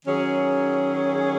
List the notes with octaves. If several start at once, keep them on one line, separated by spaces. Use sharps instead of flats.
D#3 F#3 C#4 G#4